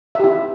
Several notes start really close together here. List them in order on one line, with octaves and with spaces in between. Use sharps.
E5 G4 E4